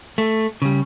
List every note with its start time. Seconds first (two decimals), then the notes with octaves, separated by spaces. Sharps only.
0.18 A3
0.62 C#3 G3